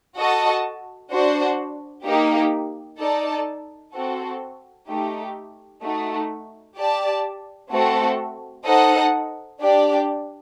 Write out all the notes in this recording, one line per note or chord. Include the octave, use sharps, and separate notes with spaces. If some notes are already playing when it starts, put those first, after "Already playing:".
F#4 A4 D#5 A5
D4 F#4 C5
A#3 D#4 G4
D#4 A4 D5 A5
C4 F#4 A4
A3 D#4 G4
A3 D#4 F#4
G4 D5 A5
A3 C4 F#4 A4
D#4 A4 C5 D#5 F#5
D4 G4 D5